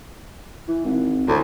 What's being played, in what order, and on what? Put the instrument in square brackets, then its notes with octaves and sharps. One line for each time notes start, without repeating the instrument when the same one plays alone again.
[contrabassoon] E3
G#1
[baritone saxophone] D2 [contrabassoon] A2